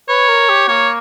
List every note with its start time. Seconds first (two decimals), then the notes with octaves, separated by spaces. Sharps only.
0.09 B4 C#5
0.28 A#4
0.49 G4
0.68 A#3 C#5